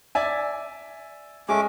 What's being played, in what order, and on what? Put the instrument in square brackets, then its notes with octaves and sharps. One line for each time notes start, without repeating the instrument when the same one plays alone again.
[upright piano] D5 E5 G#5
[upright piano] G#3 [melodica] A3 C#4 D6